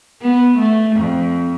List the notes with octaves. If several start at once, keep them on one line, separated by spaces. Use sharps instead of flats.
B3
A3
F2